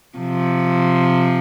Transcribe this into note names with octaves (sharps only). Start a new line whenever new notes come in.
C3 F3